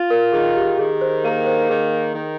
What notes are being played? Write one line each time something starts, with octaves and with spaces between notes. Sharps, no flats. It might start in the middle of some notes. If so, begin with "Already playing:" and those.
Already playing: F4
A#4
D#3 G#4
G4
D#3 G#4
C5
A#3 A#4
C5
D#3 G#4
D#3